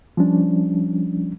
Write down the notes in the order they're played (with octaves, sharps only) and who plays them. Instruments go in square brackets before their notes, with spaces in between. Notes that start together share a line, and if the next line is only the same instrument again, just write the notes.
[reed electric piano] F3 G3 C#4 D4